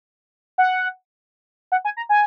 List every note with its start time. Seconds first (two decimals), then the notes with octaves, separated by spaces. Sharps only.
0.58 F#5
1.72 F#5
1.85 G#5
1.97 A#5
2.09 G#5